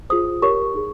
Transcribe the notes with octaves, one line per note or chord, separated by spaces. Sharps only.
F4 G#4 C5 D#6
G4 A#4 C#5 C#6
D#4 G#4